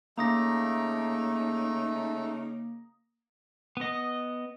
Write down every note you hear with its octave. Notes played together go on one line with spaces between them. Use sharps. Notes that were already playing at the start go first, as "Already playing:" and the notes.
C#3 A3 A#3 D#4 A#5 D6 D#6 A#6
B3 D#5